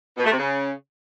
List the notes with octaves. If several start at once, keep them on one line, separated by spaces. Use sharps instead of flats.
B2
A3
C3
C#3